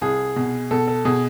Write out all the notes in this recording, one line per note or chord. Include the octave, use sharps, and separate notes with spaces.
C2 G#4
B2
B2 A4
A4
B2 G#4